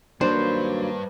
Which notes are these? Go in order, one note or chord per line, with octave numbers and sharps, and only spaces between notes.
D#2 F#3 G3 A#3 D4 B4 C5